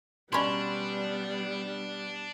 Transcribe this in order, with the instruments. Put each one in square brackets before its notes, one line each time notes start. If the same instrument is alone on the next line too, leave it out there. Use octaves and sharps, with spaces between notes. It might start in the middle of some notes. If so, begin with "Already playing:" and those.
[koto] B2 C#4 [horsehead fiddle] G3 B3 [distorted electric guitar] D4 [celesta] D5 B5 C6